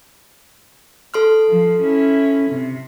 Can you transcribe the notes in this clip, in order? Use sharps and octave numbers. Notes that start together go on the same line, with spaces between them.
A4 C6 F6
F3
C#4 E4
C3